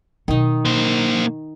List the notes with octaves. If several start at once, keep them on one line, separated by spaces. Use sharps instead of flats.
B2 D#3 F#3 D#4
A#3 C5